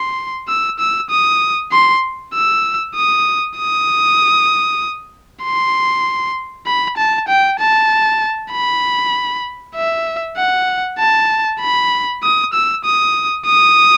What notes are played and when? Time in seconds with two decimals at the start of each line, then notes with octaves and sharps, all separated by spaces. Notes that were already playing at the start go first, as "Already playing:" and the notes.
Already playing: C6
0.48 E6
0.79 E6
1.10 D#6
1.72 C6
2.33 E6
2.95 D#6
3.57 D#6
5.43 C6
6.66 B5
6.97 A5
7.28 G5
7.59 A5
8.52 B5
9.75 E5
10.37 F#5
10.99 A5
11.61 B5
12.23 D#6
12.53 E6
12.84 D#6
13.46 D#6